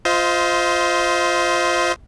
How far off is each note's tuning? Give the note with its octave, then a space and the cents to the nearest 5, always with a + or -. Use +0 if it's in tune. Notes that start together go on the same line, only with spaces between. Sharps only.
F4 +0 C5 -10 D#5 +30